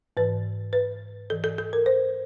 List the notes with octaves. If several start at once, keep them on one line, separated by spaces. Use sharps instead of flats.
G#2 E3 B4
B4
G#2 E3 A4
A4
A4
A#4
C5